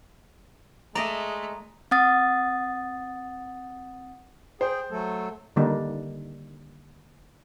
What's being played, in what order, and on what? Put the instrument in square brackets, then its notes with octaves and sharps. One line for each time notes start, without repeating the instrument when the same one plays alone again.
[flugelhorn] G#3 [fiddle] A3 [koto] D5 D#5 [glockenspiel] A#5
[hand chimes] C4 F#5 D#6 A6
[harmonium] G#4 G5 [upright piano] C5
[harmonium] F#3 A3 A4
[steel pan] D3 D#3 G3 A#3 D4 D#4